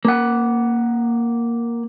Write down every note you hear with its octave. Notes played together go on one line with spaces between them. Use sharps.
A#3 F#5